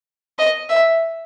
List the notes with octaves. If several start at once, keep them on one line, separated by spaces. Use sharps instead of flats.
D#5
E5